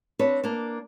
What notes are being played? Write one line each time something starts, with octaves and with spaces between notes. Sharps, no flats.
C4 D4 B4 C#5
A#3 D4